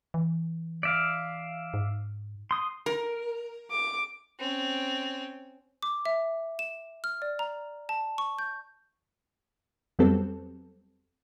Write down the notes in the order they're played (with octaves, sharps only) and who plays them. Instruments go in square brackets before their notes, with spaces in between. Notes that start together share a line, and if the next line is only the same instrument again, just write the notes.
[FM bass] E3
[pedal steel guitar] D5 E5 F5
[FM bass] G#2
[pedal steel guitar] C6 D#6
[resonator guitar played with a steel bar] A#4
[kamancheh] D6
[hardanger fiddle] C4 C#4
[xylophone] D6
E5
E7
F6
D5
A#5
A5
C#6
G6
[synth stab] F2 F#3 G3 B3 C4 A4